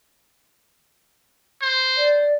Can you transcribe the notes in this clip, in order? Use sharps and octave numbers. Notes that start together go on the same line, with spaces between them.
C5
D5